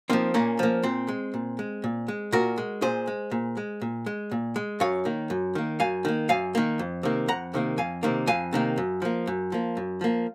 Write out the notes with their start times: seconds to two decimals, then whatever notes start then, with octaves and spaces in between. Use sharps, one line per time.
0.10 F3 A#3 C4 D#4
0.34 A#2 A#3 C#4
0.59 F3 A#3
0.83 A#2 C4
1.08 G#3
1.34 A#2
1.59 G#3
1.84 A#2
2.08 G#3
2.32 A#2 F#4 A#4
2.58 G#3
2.82 A#2 G#4 C5
3.07 G#3
3.31 A#2
3.57 G#3
3.81 A#2
4.06 G#3
4.31 A#2
4.56 G#3
4.80 F#2 C#5 F5
5.05 D#3 A#3
5.30 F#2
5.55 D#3 A#3
5.80 F#2 F5 G#5
6.05 D#3 A#3
6.29 F#2 F5 G#5
6.55 D#3 A#3
6.79 F2
7.03 C3 D#3 A#3
7.28 F2 F#5 A#5
7.54 C3 D#3 A#3
7.78 F2 F5 G#5
8.03 C3 D#3 A#3
8.27 F2 F5 G#5
8.53 C3 D#3 A#3
8.78 F#2
9.02 F3 A#3
9.27 F#2
9.52 F3 A#3
9.77 F#2
10.01 F3 A#3